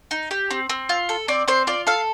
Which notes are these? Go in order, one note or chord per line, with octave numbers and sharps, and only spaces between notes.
D#4
G4
C4
C4
F4
A4
C4 D5
C4 C5
F4 D5
A4 F5